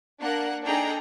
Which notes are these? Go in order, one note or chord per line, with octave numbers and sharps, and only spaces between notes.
A#3 D4 A#4 F#5 A#5 F#6
D4 D#4 G#4 A4 G5 A#5